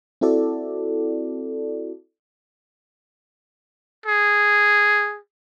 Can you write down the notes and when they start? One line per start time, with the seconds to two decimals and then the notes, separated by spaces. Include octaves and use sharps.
0.21 C4 E4 F#4 A4 D5
4.06 G#4